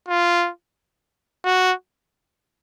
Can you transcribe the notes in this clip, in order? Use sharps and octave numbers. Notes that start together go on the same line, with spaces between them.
F4
F#4